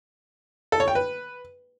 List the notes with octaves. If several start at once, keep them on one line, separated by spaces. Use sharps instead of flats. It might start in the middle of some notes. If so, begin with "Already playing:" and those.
A4
C#5
G5
B4